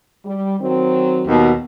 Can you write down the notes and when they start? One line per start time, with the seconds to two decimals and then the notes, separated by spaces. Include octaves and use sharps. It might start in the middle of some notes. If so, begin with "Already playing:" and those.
0.24 G3
0.60 D#3 F#3 C4
1.28 D#2 B2